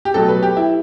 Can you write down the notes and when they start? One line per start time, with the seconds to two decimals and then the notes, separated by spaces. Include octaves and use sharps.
0.05 G4
0.14 B2 F#3 A3 A4
0.28 B4
0.43 G4
0.57 E4